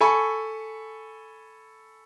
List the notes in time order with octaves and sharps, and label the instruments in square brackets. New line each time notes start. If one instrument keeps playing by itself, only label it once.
[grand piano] A4 G#5 B5 C#6